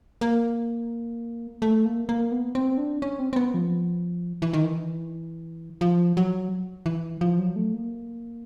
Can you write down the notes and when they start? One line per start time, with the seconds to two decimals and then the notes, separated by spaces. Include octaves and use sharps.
0.21 A#3
1.62 A3
1.85 A#3
2.09 A#3
2.32 B3
2.55 C4
2.78 D4
3.02 C#4
3.19 C4
3.33 C4
3.36 B3
3.54 F3
4.42 E3
4.53 D#3
4.64 E3
5.81 F3
6.17 F#3
6.86 E3
7.21 F3
7.39 F#3
7.56 A3
7.73 A#3